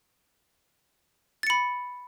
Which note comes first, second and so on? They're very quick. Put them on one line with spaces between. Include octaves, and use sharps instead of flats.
A6 C#7 B5